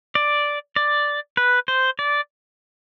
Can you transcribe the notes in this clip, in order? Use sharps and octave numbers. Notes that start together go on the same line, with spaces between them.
D5
D5
B4
C5
D5